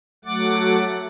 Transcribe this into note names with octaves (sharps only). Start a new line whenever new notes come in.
F#3 A3 F#5 D6 A6